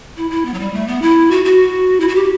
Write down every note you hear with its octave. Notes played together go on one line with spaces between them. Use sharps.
E4
E4
B3
F#3
G3
A3
B3
E4
F#4
F#4
E4
F#4
G4